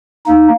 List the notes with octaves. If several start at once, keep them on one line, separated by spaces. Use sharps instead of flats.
A#3 D#4